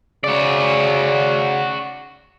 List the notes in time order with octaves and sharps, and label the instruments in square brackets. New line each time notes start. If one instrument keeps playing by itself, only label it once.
[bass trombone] C#3 [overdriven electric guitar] F#4 D5